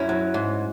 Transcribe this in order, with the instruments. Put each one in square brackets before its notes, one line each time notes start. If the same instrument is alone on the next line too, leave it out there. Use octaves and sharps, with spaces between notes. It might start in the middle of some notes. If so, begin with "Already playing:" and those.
Already playing: [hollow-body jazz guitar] F#2 C#4 E4
F#3
G#2